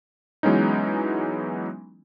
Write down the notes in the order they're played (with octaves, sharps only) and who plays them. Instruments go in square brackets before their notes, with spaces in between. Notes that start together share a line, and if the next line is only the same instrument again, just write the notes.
[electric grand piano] E3 F#3 G#3 B3 C#4 D#4